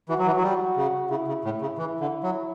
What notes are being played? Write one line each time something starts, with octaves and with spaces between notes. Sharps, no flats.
E3 F#4
F#3
E3
F#3
G3 F#4
C#3
C#3 E4
C#3
A2
C#3
E3
D3
F#3